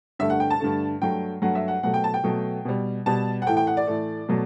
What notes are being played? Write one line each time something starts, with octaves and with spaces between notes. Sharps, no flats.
G2 D3 A3 E5
F#5
G5
A5
G2 D3 A3
G2 F#3 A3 G5
G2 F#3 A3 F#5
E5
F#5
B2 F#3 A3 F#5
G5
A5
G5
B2 F#3 A3
B2 G3
B2 G3 A5
F#5
A2 E3 A3 G5
G5
F#5
D5
A2 E3 A3
B2 F#3 A3